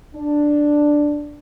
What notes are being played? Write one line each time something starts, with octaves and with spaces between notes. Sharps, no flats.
D4